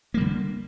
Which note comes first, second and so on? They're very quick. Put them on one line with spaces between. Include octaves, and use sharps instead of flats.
A#3 G3 D3